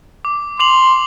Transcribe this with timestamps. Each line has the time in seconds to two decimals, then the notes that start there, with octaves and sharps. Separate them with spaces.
0.25 D6
0.60 C6 D6 F7 F#7